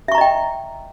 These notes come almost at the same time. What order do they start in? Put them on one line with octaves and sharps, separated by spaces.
E5 C#6 A#5 D#5 G5